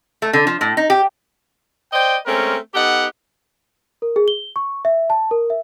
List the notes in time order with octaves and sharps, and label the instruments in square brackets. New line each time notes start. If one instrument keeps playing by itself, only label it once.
[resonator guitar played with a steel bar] A3
D3
F3
A2
D#4
G4
[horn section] C5 D5 D#5 G5
G#3 A3 C4 C#4 A#4
B3 D#4 G4 A4 F#5
[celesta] A#4
G#4
G7
C#6
E5
A5
A#4
E5